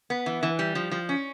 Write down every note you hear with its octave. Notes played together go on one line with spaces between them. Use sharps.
B3
E3
E3
G3
F3
F3
C#4